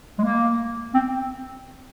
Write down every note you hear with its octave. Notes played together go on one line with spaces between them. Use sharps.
G#3
A#3
C4